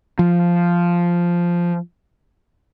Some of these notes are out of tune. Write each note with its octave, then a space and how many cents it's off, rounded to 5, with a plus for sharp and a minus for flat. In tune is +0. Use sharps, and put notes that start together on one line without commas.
F3 -5